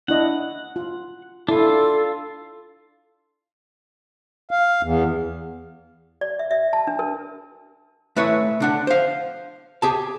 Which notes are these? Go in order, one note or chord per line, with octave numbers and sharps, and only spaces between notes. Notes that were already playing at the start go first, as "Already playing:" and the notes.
D4 E4 D#5 F#5
F4
D4 E4 F4 A4
F5
E2
D5
E5
E5
A5
D4
A#4
A3 E4 B4 C#5
D3 D4 F#5
C5 F5
G4 G#4 A5